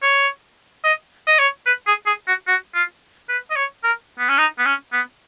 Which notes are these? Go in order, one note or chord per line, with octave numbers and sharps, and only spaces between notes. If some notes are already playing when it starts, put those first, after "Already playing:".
C#5
D#5
D#5
C#5
B4
G#4
G#4
F#4
F#4
F4
B4
D#5
C#5
A#4
B3
C#4
D#4
B3
C#4
B3